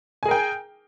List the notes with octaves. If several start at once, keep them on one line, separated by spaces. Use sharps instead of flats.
G#4 A#4 G5 G#5